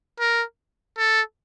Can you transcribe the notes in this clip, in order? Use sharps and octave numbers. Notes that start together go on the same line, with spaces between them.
A#4
A4